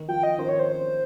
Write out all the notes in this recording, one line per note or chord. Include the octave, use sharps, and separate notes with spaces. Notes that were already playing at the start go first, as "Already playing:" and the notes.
Already playing: D#3
F3 G5
D#5
D#3 C5
C#5
C5